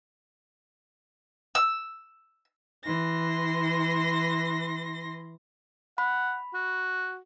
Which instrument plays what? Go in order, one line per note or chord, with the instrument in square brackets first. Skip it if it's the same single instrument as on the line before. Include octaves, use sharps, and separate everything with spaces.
[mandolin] E6
[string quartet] E3 C6 A#6
[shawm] F#5 [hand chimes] B5
[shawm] F#4